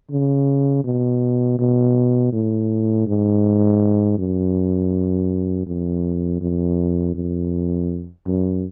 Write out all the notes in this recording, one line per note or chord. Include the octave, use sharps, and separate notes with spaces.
C#3
B2
B2
A2
G#2
F#2
F2
F2
F2
F#2